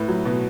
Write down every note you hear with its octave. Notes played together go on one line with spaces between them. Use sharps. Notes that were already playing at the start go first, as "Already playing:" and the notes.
Already playing: A2 B4
F#3
B2